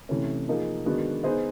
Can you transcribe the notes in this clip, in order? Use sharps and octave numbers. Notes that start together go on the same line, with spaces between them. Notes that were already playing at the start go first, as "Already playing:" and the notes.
C3 E3 A3 C#4
F3 A#3 D#4 G#4
D#3 G#3 B3 D4 F#4
B3 D#4 G#4 C5 D#5